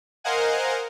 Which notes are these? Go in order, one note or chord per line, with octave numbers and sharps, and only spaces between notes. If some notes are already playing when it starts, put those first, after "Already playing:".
A#4 C5 D#5 F5 F#5 G#5